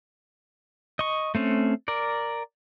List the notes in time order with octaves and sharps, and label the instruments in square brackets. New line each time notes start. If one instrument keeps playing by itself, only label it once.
[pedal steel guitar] D#5 C#6
A3 C4 C#4
A#4 D5